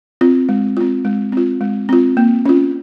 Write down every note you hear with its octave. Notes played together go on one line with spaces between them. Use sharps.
C4 F4
G#3
C4 F4
G#3
C4 F4
G#3
C4 F4
A#3
C#4 F4